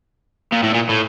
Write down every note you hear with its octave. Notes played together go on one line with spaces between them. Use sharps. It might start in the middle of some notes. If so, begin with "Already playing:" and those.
A#2
A2
A#2
A2